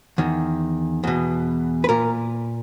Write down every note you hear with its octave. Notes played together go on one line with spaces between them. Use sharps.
E2 D#3
E2 B2
B4
A#2 A#4